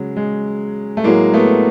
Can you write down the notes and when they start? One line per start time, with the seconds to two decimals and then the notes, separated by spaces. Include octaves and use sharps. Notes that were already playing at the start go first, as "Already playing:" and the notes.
Already playing: C#3 F#3 G#3
0.16 G#3
0.97 A3
1.04 A2 F#3 G#3 A#3
1.33 A3 B3